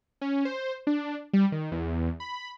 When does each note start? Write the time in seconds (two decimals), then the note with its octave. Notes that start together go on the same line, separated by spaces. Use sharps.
0.21 C#4
0.45 C5
0.87 D4
1.33 G3
1.52 D#3
1.72 E2
2.20 B5